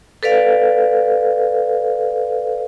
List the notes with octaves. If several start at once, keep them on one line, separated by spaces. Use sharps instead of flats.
A4 B4 D5 F5